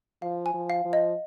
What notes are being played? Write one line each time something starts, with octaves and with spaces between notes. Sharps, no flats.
F3 F5
G#5
F3
F5
F3
D#5